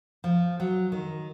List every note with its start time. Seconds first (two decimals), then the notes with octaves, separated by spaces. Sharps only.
0.24 F3
0.60 F#3
0.92 D#3